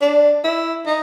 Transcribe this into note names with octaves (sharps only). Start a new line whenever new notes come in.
D4
E4
D#4